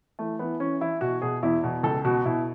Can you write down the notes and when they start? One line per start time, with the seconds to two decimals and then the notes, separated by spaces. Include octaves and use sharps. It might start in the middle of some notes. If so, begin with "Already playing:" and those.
0.19 E3 A3
0.39 E3 B3
0.60 E3 C#4
0.81 E3 E4
1.01 B2 F#4
1.22 B2 G#4
1.43 E2 E4
1.64 B2
1.83 C#2 A4
2.05 B2 F#4
2.25 B2 E4